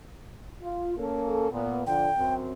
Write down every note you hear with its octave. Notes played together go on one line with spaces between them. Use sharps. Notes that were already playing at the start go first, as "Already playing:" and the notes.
F4
A#3 C#4 A4
A#2 B3
D3 F3 G5
F#2 C4